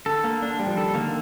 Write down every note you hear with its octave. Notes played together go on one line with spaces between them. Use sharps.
D3 A4
A#3
D3 D4
G3
F3
D#3 A4
D3 A#3